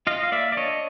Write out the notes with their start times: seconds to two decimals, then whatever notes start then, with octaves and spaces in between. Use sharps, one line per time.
0.07 F4 D#5 F5
0.23 F5
0.32 A#3 D5 E5
0.52 D5
0.57 D4 C#5 D#5